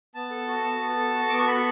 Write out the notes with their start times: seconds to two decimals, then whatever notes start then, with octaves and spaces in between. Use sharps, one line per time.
0.14 B3 A5
0.31 A4
0.48 F#4
0.64 B3
0.81 B3
0.97 A4
1.14 F#4
1.30 B3 D6
1.39 C#6
1.48 A4 B5